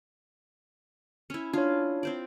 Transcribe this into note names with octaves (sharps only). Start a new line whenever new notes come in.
C#4 E4
D4 E4 F4 C#5
C4 C5 D5